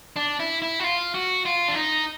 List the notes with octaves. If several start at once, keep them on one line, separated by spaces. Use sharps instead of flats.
D4
E4
E4
F#4
F4
F#4
F4
D4
D#4